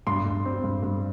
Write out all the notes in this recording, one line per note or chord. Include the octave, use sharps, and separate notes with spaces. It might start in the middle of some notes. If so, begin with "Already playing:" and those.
G2 C6
G2
C4
G2
G2